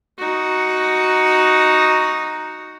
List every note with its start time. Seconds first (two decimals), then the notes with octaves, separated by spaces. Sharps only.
0.18 D#4 F#4